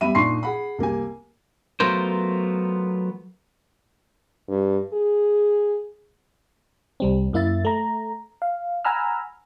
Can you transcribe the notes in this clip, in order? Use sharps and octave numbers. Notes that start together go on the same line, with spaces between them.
G3 B3 E5 B5 D#7
A#2 D4 D#4 C6 C#6 C7
G#4 F#5 B5
C2 A#3 G4 G#5
F#3 A3 B3 F4 A#4 C5
G2
G#4
C2 G3 C4
F#2 A#3 E4 E5 A6
A3 A#5
F5
F#5 G#5 A#5 B5 E6 F6